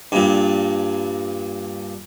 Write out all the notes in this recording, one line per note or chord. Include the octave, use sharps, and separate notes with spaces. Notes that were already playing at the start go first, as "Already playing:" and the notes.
G2 A#2